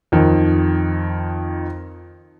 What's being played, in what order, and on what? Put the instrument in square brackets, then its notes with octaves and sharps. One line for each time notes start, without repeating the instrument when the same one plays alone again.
[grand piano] F2 D#3